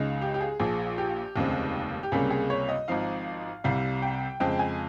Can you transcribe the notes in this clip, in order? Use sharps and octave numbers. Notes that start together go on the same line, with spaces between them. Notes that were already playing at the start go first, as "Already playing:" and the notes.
Already playing: C#2 C#3 G#3 D#4
G4
G4
G#4
A#1 A#2 F3 G#4
G4
F1 D#2 C#3 G#3 C4
G4
C#2 C3 G3 A#3 C#4 G#4
G#4
C#5
D#5
G#1 G#2 F3 C4 D#4 F5
C2 C3 G3 F5
G5
F2 C#3 G#3 C4 G5
G#5